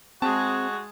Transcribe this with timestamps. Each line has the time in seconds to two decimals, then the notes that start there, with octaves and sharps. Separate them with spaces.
0.22 G#3 C4 F#4 G#4 A5